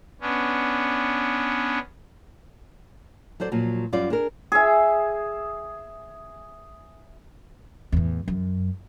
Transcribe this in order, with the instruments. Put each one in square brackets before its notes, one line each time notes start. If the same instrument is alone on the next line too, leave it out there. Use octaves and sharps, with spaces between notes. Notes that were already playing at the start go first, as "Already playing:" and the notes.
[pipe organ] B3 C#4 D4
[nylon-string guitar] F#3 A4 C5 D5
A#2 F3 F#3
F#2 G3 F4 D5
D4 G#4 A#4
[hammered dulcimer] G#4 E5
[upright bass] E2 A2
F#2